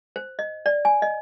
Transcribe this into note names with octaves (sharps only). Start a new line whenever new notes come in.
C5
D#5
D5
G#5
D#5